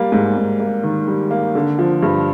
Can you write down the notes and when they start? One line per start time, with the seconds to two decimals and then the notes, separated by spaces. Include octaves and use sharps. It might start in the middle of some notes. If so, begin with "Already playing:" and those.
Already playing: G3 A#3
0.12 G#2
0.37 G#2
0.60 A#3
0.83 D#3
1.08 G3
1.31 A#3
1.55 D3
1.79 F3
2.02 G2